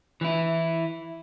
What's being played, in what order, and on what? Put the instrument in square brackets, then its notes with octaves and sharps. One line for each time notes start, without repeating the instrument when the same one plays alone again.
[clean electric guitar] E3 E4